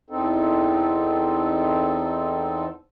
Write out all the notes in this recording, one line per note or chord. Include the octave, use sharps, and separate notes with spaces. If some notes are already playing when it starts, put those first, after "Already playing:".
E2 C4 D#4 A4